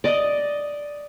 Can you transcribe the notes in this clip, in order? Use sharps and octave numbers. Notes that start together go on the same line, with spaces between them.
D5 D#5